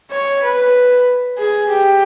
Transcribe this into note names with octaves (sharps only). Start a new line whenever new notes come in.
C#5
B4
G#4
G4